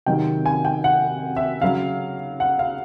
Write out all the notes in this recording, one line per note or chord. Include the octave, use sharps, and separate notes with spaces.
C3 D#3 F#3 G5
G#5
G5
F#5
E5
C#3 F#3 F5
F#5
F5